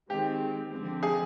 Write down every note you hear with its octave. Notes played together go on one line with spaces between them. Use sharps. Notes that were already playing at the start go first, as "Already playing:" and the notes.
D#3 G#3 C4 G4
D3 F3 G#3 C4
G#4